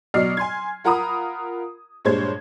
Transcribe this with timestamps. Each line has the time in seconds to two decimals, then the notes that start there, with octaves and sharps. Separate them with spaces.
0.14 B2 F#3 D5 D#5 F6 C7
0.37 G#5 C6 G#6
0.84 F4 A#4 F#5 A#5 B5 D#6
2.05 G2 A#2 G#3 C5 C#5 G#6